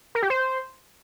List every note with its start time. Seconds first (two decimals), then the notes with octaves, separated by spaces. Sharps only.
0.15 A#4
0.22 G4
0.30 C5